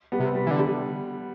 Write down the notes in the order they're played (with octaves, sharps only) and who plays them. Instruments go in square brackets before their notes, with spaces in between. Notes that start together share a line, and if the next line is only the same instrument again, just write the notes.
[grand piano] G3 B3
[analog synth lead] C3
[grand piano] G3
[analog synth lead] E3
D3
[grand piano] G3